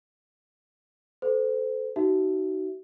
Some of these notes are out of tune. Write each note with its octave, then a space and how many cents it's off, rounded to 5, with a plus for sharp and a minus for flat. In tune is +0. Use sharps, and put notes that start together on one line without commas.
A4 -10 C5 -30
D#4 +0 F#4 +35 E5 +0